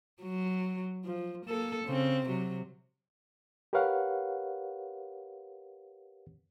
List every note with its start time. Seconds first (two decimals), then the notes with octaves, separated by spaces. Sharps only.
0.22 F#3
1.04 F3
1.46 A#3 A4
1.85 C#3 C4
2.27 C3 F#3
3.73 G4 A#4 B4 C#5 F5 F#5